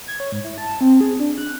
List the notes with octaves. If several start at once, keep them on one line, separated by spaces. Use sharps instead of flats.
G#6
C#5
G#2
E4
A5
C4
G#4
D4
F#6